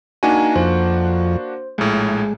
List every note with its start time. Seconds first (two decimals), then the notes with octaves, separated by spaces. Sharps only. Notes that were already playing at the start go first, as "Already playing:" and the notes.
0.23 A#3 D4 D#4 F#4 G#5
0.56 F2 C5
1.78 A#1 A2 G#3